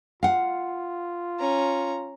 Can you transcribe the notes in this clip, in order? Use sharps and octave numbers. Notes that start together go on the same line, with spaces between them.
F4 F5 F#5
C#4 A#5